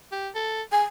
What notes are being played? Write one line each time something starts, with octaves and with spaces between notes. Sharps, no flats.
G4
A4
G#4 G#5